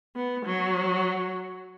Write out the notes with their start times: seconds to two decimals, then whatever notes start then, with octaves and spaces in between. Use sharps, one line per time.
0.16 B3
0.45 F#3